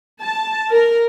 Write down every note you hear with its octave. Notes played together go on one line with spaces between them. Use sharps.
A5
A#4